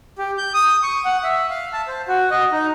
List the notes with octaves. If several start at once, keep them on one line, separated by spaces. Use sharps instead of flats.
G4
G6
D#6
C#6
F#5
E5
F5
A5
C5
F#4
D#5
D#4